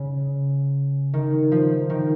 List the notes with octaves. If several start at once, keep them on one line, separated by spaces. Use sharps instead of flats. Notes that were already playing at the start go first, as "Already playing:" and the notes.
Already playing: C#3
D#3
F3
D#3